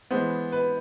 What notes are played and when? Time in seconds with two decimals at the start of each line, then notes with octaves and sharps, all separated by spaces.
0.11 E3 G#3 B3 C5
0.52 B4